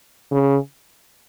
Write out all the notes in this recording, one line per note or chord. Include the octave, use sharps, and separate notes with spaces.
C#3